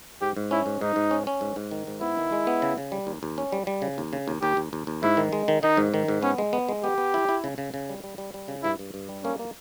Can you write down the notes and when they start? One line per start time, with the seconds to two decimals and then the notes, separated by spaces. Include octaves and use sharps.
0.22 G#2 G4
0.37 G#2
0.51 C#4 E4
0.66 G#2
0.81 G#2 D#4
0.96 G#2
1.11 C#4
1.27 C#4
1.41 G#2
1.56 G#2
1.71 D#3
1.87 G#2
2.01 B3 E4
2.17 D#3
2.32 G#3
2.47 B3
2.62 C#3
2.78 C#3
2.92 G3
3.07 D#2
3.23 D#2
3.38 C#4
3.52 G3
3.67 G3
3.82 C#3
3.98 D#2
4.13 C#3
4.28 D#2
4.42 D#2 G4
4.57 D#2
4.73 D#2
4.87 D#2
5.03 G#2 E4
5.17 D#3
5.33 G#3
5.48 D#3
5.63 D#3 D#4
5.77 G#2
5.94 D#3
6.08 G#2
6.23 B3 C#4
6.38 G#3
6.53 B3
6.69 G#3
6.84 B3 G4
6.98 B3
7.14 E4
7.29 E4
7.44 C#3
7.58 C#3
7.74 C#3
7.89 G3
8.04 G3
8.18 G3
8.34 G3
8.48 C#3
8.63 G2 E4
8.79 G2
8.94 G2
9.09 G3
9.24 A#3 C#4
9.39 A#3